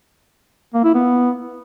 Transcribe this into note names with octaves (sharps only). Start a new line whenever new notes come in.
A#3
E4
B3